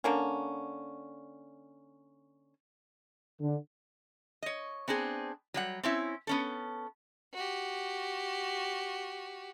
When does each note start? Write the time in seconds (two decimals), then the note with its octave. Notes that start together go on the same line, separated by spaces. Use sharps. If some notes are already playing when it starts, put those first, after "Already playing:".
0.04 D3 A#3 C#4
3.40 D3
4.43 C#5 D#5
4.88 B3 C4 D4 G#4
5.54 F#3 G3 F#5
5.83 C4 C#4 E4
6.27 B3 C#4 A4
7.33 F#4 G4